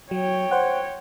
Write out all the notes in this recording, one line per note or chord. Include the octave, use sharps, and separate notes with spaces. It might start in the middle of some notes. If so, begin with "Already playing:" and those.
F#3 C#5 G5
C5 F#5